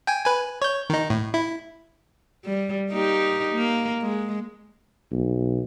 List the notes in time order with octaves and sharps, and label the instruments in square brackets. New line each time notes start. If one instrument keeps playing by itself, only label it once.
[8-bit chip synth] G5 G#5
B4 G#5
C#5 G6
D#3 D#4
A2
E4
[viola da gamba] G3
A#3 D#4 G4
A#3
G#3
[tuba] B1